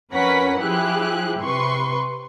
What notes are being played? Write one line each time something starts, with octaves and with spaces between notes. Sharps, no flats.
F2 C#4 A#4 B4 F#5 B6
F3 E4 G4 G#4 F#6
C3 B4 C6 C#6